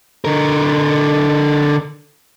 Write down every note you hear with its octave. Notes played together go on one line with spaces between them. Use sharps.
D3 A#4